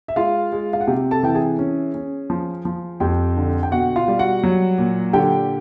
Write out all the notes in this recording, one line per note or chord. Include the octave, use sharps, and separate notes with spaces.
E5
G#3 F4 F5
G#3
F5
F#5
C3 G4 G5
A4 A5
E3 G5
G#4 G#5
C#4
C#4
F3
F3
F2 G4 G5
D3
G5
B2 F#4 F#5
F4 F5
G3
F#4 F#5
F#3
A#2
D3 G4 G5